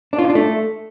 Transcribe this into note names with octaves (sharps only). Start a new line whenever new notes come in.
D4
F4
D#4
D4
A3